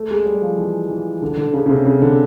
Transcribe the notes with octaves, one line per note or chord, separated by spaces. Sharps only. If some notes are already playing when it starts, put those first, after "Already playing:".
Already playing: A3
G#3
G3
F3
E3
E3
D3
D3
C#3
C#3
C3
C#3
D3